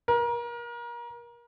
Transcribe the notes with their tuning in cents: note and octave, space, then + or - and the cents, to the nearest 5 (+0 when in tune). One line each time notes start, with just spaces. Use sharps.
A#4 +30